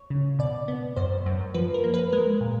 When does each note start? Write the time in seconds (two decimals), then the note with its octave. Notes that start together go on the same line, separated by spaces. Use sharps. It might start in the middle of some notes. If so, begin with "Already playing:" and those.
Already playing: C#5
0.10 C#3
0.39 B2 D5
0.68 B3
0.96 F#2 C5
1.26 F#2
1.54 F3 B4
1.74 A#4
1.84 A#3
1.94 B4
2.12 G#3 A#4
2.41 A#2